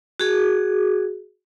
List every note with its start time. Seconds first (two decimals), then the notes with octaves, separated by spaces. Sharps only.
0.20 F#4 G#4